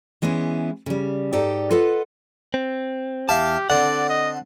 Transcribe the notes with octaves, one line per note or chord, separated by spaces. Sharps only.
E3 G#3 B3 C#4 E4
C#3 G3
G#2 D#4 G4 A4 D5
F4 A4 B4 D#5 F#5
C4
E2 G4 E5 F5 A5
D3 C4 D5 F#5
D#5